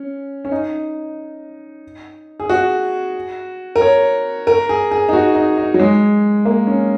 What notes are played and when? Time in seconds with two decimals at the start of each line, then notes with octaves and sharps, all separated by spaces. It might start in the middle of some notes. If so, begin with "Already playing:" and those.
Already playing: C#4
0.45 C#4
0.52 D#4
2.40 G#4
2.49 F#4
3.76 A#4
3.81 C#5
4.47 A#4
4.69 G#4
4.91 G#4
5.09 D#4
5.13 F#4
5.35 D#4
5.58 D#4
5.74 F#3
5.79 G#3
6.45 A#3
6.67 C#4